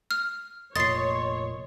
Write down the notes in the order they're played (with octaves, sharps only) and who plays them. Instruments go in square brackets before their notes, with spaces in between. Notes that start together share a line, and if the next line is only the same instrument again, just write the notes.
[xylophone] F6
[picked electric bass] F1 A#2 [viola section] C#5 [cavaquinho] D#5 C6 [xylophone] A6 C7